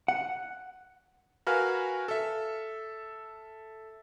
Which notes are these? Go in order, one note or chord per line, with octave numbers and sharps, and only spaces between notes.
F#5
F#4 A#4 B4 F5 G#5 F6
A4 E5